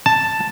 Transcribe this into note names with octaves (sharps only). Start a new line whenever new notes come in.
A5